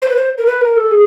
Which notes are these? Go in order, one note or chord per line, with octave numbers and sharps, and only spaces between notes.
C5
B4
C5
A#4
B4
A#4
A4
G#4